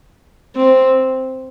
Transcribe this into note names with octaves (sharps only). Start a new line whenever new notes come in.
C4